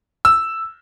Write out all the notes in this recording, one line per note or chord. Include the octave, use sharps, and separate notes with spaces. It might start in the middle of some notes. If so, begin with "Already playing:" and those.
E6